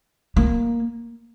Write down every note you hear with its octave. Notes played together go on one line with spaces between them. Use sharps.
A#3